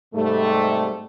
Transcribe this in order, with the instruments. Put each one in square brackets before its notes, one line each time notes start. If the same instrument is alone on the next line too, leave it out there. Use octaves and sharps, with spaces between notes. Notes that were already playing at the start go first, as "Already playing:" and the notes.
[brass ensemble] G#2 C3 G3 A3